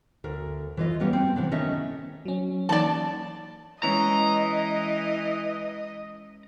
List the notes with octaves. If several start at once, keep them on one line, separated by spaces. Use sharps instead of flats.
D2 A#4
E3 F4 D#5
G3 A#3 B3 C#4 G4
C4 C5 G5
C3 E3 B3 D4
D#3 A3 C#4 D#5 E5
F#3 C#4
E3 A#3 D#4 D5 A5
E3 G#3 C#4 D#5 A#5